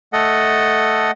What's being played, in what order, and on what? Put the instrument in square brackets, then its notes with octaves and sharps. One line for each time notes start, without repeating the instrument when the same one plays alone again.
[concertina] A3 A4 D#5 F#5